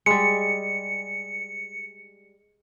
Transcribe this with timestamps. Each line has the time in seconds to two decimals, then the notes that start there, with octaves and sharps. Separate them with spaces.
0.06 G3 G#3 C#7